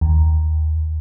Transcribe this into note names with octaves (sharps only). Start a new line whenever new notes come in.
D#2